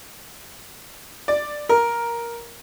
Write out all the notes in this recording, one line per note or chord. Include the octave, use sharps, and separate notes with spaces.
D5
A#4